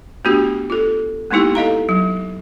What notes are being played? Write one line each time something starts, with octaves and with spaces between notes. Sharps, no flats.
A3 B3 D4 F#4 G4
F4 A4
G#3 A#3 B3 D#4 E4 G4
A4 D#5 F5 A#5
F#3